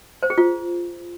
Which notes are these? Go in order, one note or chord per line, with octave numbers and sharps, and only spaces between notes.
C5
G#4
F4